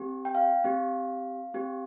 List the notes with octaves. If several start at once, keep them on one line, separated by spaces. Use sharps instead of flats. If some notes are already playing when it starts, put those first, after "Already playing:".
Already playing: C4 G4
G5
F5
C4 G4
C4 G4